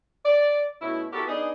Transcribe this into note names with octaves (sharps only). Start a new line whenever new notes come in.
D5
B2 A3 C#4 E4
B3 E4 F#4 G4 A4 A#4
B3 D4 D#4 G#4